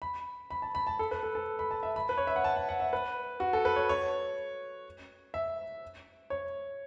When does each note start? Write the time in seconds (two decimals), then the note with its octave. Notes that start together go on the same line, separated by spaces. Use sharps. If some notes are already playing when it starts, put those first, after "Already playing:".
0.02 B5
0.50 B5
0.62 A5
0.75 B5
0.87 A5
0.99 A4
1.11 B4
1.23 A4
1.35 A4
1.59 B5
1.71 A5
1.83 E5
1.96 B5
2.09 B4
2.18 C#5
2.27 E5
2.36 F#5
2.44 A5
2.56 F#5
2.69 F#5
2.80 E5
2.93 B4
3.40 F#4
3.53 A4
3.65 B4
3.76 C#5
3.89 C#5
5.34 E5
6.30 C#5